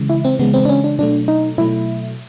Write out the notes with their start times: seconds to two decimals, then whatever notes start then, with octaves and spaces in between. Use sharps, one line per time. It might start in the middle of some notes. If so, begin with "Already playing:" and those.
Already playing: C#3 E3 G#3
0.10 E4
0.25 C4
0.39 C#3 E3 G#3 B3
0.54 C4
0.65 D4
0.69 C#4
0.84 D4
0.99 B2 F#3 A3 D4
1.28 D#4
1.58 B2 F#3 A3 E4